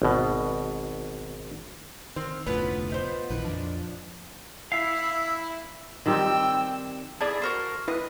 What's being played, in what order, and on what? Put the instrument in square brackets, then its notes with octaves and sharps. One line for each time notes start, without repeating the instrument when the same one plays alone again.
[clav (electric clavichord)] G#1 B2
[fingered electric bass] D#3 [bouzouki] C4 [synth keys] F6
[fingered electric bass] F1 D2 A2 [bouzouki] B3 C#4 [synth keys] F4 B4 F#5
[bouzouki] B3 D#4 C5
[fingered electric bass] A#1 D#3 E3 [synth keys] B4
[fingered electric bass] F2 [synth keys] A#2 F3 D4
[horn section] E4 [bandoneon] E5 [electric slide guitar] F5
[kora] D#3 G3 C4 [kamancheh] G5 E6
[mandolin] B3 E4 G#4 [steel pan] D5 A5
[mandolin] F#4 A#4 C5
[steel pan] E4 B4 [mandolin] D#5